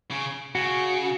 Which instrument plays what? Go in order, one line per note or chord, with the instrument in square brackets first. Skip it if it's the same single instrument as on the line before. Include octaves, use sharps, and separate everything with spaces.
[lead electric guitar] C#3
[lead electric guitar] C#3 [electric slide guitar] F#4